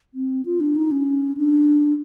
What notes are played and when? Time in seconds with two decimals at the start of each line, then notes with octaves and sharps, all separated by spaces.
0.14 C4
0.45 F4
0.60 D4
0.76 D#4
0.91 C#4
1.37 D4